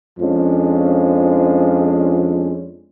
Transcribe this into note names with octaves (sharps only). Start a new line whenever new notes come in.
F2 F3 G#3 C#4 D4